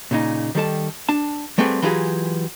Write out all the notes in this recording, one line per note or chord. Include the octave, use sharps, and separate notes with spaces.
A#2 C#3 D#4
D#3 G3 A4 A5
D4 A5
G3 A3 C4 G#4 B4 F#5
E3 F#3 F4 G4 G#4